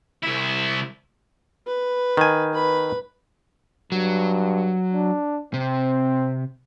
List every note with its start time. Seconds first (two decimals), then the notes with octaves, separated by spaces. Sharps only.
0.23 C2 E4
1.67 B4
2.17 D#3 G#5
2.54 B4 B5
3.92 G2 F#3
4.93 D4
5.54 C3 C4